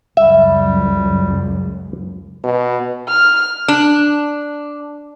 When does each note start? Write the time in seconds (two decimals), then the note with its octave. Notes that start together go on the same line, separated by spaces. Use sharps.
0.17 C#2 F#2 G3 E5
2.44 B2
3.09 F6
3.68 D4